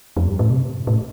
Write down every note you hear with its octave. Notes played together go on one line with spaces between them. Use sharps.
F2
G2
A2
C3
A2